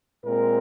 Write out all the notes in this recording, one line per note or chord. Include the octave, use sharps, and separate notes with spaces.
A#2 G#3 C4 A#4